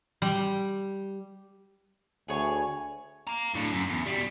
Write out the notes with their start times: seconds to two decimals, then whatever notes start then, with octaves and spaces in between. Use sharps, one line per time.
0.22 G3
2.28 D2 G#4 C#5
3.27 F5 A#5
3.54 A2 D3
3.72 F#2
3.90 E2
4.06 B2 G3